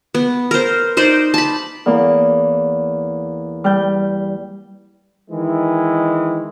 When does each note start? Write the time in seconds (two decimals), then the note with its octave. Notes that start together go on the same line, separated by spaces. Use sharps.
0.15 B3
0.51 A#4 C5
0.97 D#4 C5 D5
1.34 A5 B5
1.86 E2 A#3
3.64 G3 G6
5.30 D#3 E3 G#3 E4